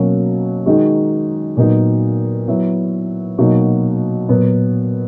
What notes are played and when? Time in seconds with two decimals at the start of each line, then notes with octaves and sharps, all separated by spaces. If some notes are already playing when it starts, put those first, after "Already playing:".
Already playing: B2 F#3 A#3 C#4 F#4
0.66 D#3 G#3 D#4 F#4
1.57 A#2 F#3 B3 D#4 F#4
2.48 F#3 B3 E4
3.38 B2 F#3 A#3 D#4 F#4
4.29 A#2 F#3 B3